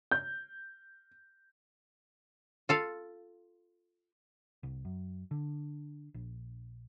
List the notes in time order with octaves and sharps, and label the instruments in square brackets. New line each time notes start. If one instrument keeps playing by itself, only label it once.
[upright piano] G6
[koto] F4 A4 F5
[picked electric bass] C2
F#2
D3
A#1